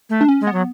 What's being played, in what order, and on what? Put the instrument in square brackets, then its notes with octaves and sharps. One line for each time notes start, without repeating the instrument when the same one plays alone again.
[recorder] A3
[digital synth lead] D4
C#4
[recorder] G#3
[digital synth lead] B3
[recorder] F#3